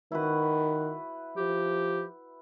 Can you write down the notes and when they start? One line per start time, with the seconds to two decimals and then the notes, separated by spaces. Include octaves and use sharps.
0.12 D#3 E4 F#4 B4
1.37 F3 G4